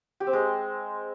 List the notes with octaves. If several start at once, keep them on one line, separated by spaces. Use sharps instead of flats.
G4
C4
G#3